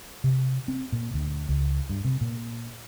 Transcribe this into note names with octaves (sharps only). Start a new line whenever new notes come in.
C3
C4
A#2
D2
C#2
G2
C3
A#2